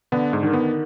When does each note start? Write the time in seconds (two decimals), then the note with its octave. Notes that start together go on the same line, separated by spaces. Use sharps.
0.12 D3 B3
0.33 G#2
0.43 D#3
0.53 B3